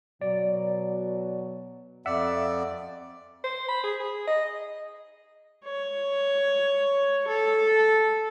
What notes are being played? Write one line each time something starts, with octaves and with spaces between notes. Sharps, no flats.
B2 F#3 D5
F2 D5 E5 F#5 E6
C5
B5
G#4
G#4
D#5
C#5
A4